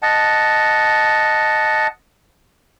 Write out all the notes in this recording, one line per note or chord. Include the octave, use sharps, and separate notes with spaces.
D#5 F#5 A5